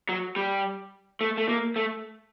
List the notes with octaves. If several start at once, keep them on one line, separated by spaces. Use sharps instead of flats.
F#3
G3
A3
A3
A#3
A3